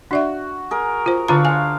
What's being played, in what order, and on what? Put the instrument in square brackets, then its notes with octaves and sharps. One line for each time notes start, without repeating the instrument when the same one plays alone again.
[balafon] D4 D5 E5 [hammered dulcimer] F#4
[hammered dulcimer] G#4 A#4
[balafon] F4 C5
[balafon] D3 F4 A#5 [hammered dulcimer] D4 C#5 F5
[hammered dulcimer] C5 F5 [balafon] G#5